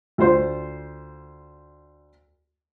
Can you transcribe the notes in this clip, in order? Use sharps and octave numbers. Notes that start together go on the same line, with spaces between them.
D2 F4 C5 C6